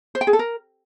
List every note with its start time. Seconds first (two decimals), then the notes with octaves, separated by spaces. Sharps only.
0.15 C5
0.21 G5
0.27 G#4
0.33 A4
0.39 A#4